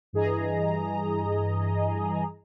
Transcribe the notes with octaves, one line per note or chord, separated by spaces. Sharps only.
G2 E3 G#4 D#5 A#5